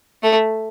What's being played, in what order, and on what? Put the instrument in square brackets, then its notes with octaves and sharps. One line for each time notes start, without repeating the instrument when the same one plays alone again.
[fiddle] A3